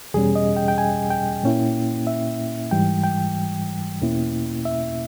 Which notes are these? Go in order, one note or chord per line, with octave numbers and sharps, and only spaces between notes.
E2 B2 G3 C#4 G#4
D#5
G5
G5
G#5
G5
A#2 A#3 C#4 E4
E5
G#2 E3 G3 G5
G5
E2 B2 A#3 C#4 E4
E5